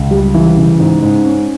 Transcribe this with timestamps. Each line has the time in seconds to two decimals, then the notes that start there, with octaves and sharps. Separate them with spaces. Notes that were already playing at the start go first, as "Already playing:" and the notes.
Already playing: C#2
0.11 G3
0.34 E3
0.57 C#3
0.80 G#2
1.02 G#2
1.26 C#4